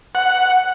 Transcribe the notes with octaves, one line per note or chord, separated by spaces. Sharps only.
F#5